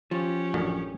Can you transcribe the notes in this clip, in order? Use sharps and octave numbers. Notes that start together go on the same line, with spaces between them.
F3 C#4 G4
A1 F#2 D3